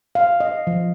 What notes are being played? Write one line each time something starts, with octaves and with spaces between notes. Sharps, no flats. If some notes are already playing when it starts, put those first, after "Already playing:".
F5
D#5
F3